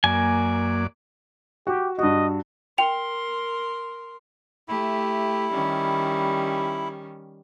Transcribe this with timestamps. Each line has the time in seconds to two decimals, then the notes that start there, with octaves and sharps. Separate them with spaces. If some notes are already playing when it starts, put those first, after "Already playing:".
0.04 F#2 A#3 D5 G#5
1.67 F#4 G4
1.99 G2 F#4 D#5
2.78 A#4 G5 C6 F7
4.68 A3 E4 G4
5.52 D#3 G3 C#4